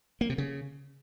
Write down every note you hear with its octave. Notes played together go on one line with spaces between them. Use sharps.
A#3
C3
C#3